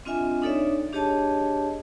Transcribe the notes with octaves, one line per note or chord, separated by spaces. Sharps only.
C4 D4 F4 D#5 E5 G#5
D4 D#4 A4 C#5 D5 E5
D4 G4 G#4 C#5 D#5 A5